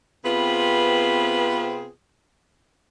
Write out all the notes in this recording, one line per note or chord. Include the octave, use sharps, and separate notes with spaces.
C3 B3 C4 F4 G#4 B4